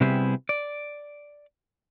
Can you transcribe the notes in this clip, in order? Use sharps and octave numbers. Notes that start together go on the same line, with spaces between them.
C3 G3 B3 E4 G4 G#4
D5